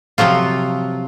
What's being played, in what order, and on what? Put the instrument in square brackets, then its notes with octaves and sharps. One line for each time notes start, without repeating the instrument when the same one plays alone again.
[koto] C3 F3 F#3 F4